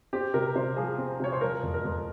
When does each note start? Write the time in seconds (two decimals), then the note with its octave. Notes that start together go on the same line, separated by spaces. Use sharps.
0.13 C4 G4
0.34 C3 A#4
0.55 C3 C5
0.76 F3 G#4
0.98 C4
1.20 C3 C#5
1.32 C5
1.41 F3 A#4
1.63 F2
1.74 A#4
1.84 F2